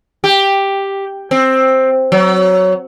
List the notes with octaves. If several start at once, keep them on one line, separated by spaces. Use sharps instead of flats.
G4
C4
F#3